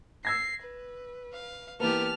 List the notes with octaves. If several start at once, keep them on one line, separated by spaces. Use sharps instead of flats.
E6 G#6 A#6 C7
B4
F5
E3 A#3 B3 G4 A5 F6